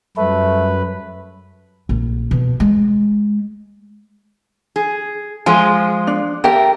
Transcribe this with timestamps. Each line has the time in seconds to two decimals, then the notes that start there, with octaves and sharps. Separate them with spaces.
0.17 F#2 G3 A3 B4
1.89 A#1
2.31 B2
2.60 G#3
4.76 G#4
5.46 F3 G#3 F4 G#5
6.07 D4
6.44 A3 G4 A#4 G5